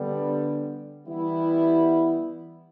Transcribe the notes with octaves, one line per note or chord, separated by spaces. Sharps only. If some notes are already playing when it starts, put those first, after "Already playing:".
Already playing: D3 G3 B3
E3 G3 B3 E4